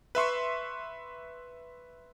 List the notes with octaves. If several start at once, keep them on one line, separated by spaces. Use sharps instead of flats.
B4 E5 C6 C#6